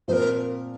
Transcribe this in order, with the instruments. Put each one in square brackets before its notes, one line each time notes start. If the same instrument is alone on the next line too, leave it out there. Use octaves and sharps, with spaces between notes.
[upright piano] A#2 F3 C4 F4 [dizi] A#4 C5